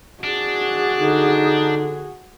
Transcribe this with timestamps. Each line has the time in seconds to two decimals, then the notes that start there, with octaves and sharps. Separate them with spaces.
0.24 D4 F#4 G#4
0.98 D3 D#4